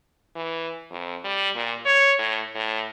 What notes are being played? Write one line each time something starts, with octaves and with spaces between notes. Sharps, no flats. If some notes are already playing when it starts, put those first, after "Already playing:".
E3
F2
G3
A#2
C#5
A2
A2